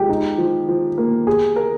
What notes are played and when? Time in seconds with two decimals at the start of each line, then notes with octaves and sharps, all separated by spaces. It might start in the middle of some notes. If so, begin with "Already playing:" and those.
Already playing: F3 G#3 G4
0.09 D#4
0.38 F3
0.68 F3
0.98 A#3
1.27 G4 G#4
1.56 A#4